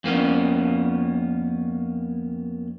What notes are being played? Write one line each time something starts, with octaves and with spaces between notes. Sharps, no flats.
F2 A#3 B3 C#4